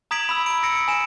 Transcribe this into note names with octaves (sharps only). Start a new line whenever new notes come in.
A#5 D#6 G#6 B6 D7 F#7
B5 E6
D7
D#6 E6 A#6 C#7 D7
G#5 B5 D7 E7